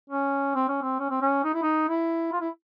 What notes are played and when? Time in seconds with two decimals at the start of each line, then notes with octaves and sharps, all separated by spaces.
0.10 C#4
0.55 C4
0.69 C#4
0.82 C4
0.99 C#4
1.10 C4
1.22 C#4
1.44 D#4
1.54 E4
1.63 D#4
1.89 E4
2.33 F4
2.41 E4